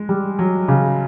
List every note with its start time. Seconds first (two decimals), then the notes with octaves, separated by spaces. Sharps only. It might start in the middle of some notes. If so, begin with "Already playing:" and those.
Already playing: G#3
0.09 G3
0.39 F#3
0.68 C#3